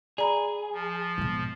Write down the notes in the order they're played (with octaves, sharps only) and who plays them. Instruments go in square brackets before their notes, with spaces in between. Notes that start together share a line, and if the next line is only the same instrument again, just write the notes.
[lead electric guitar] G#4 [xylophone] D5 A#5 B5
[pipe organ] F3
[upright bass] G#2 B2